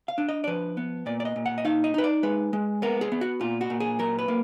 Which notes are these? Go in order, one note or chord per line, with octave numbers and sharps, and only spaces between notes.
F5
D4
D#5
D5
F3 B4
B3
A#2 D5
D5
D#5
A#2
F#5
D#5
D#4 F5
D#5
D#4 B4
D5
G#3 B4
G#3
B3 A#4
G#4
B3
F#4
A#2 F4
F#4
A#2
G#4
F#3 A#4
B4
A#3